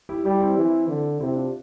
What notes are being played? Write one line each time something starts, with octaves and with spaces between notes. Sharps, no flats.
E4 G4
G3 E4 G4
C4 E4
E3
D3
C3 C4 E4
D4 F4